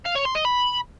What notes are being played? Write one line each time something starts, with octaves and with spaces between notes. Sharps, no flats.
F5
C#5
C6
D#5
B5